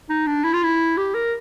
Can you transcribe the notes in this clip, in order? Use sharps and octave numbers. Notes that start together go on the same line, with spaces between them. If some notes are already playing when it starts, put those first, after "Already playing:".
D#4
D4
E4
F4
E4
G4
A#4